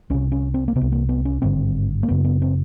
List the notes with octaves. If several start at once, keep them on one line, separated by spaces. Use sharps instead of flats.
C2 C3 C#4
C#4
C4
A#3
C3 B3
C2
A#3
B3
C#4
G#1 G2 D3 C4
A#3
F#1 F#2 C#3 B3
B3
C4